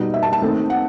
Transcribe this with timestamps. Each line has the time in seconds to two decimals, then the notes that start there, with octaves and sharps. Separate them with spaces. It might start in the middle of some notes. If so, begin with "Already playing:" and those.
Already playing: B2 G3 D#4
0.14 E5
0.23 A5
0.33 A5
0.42 D#3 A3 C4 D#4
0.70 F#5